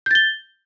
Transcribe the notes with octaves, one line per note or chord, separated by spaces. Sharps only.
G6 A6 G7